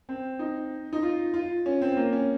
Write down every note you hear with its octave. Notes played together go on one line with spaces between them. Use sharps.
C4
D#4
D#4
F4
F4
C#4
C4
A#3
C#4